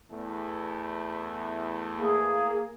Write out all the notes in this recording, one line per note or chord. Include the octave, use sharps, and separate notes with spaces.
E2 A3
A#3 G#4